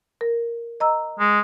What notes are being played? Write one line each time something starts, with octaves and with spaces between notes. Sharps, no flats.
A#4
D#5 A#5 E6
G#3